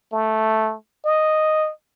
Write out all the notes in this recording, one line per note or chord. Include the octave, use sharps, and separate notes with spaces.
A3
D#5